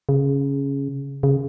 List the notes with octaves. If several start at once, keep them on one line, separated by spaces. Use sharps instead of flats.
C#3
C#3